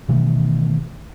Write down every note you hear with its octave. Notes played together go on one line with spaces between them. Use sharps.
B2 D#3 E3 A3